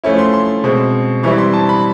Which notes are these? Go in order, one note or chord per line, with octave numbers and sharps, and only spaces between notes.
F3 A3 C#4 E4
C6
C6
B2 G#3 C4
E3 G3 C4 E4 C#6
C6
A5
B5